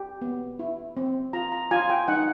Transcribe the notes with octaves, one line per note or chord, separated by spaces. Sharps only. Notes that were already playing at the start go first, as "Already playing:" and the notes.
Already playing: G4
B3
E4
C4
F4 A#5
A#5
F4 G#5
G5
D#4 F#5